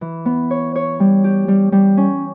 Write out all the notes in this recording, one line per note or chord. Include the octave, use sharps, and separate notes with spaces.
E3
B3
C#5
C#5
G3
G4
G3
G3
C#4